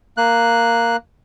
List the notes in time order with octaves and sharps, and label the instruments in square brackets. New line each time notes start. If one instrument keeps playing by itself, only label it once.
[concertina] A#3 F#6